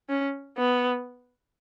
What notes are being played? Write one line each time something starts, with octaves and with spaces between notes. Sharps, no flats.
C#4
B3